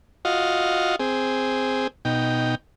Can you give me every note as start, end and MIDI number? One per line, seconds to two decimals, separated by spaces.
0.25 0.96 65
0.25 0.96 66
0.25 0.96 75
0.25 0.96 77
1.00 1.87 60
1.00 1.87 68
2.05 2.55 47
2.05 2.55 63
2.05 2.55 79